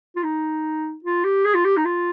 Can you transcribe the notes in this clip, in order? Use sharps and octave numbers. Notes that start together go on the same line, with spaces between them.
F4
D#4
F4
G4
G#4
F4
G4
D#4
F4